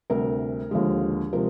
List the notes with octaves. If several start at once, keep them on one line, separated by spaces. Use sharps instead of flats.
D2 C3 G3 A#4
D#2 D3 F3 G#3
C3 F3 G#3 A#4